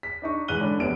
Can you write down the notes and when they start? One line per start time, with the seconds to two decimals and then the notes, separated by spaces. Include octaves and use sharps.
0.03 B6
0.22 D4 D#4 C#6
0.48 G#2 E3 F#6 D#7 G7
0.61 D3 C#4 D4 B5
0.79 F1 F#2 B3 D7